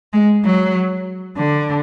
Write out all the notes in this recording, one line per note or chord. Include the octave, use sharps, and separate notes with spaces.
G#3
F#3
D3